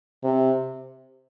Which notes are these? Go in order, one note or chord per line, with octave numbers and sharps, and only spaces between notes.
C3